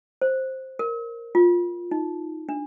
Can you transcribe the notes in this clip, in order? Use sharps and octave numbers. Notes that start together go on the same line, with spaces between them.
C5
A#4
F4
D#4
D4